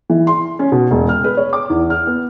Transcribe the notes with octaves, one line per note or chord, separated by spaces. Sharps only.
E3
C6
C#4
B2
E1
F6
B4
C#5
D6
E2
F6
B3